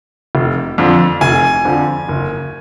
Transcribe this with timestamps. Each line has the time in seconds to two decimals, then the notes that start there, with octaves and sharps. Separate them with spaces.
0.35 F1
0.78 F2 D3 F3
1.21 F1 G#5
1.65 F2 D3 F3
2.09 F#1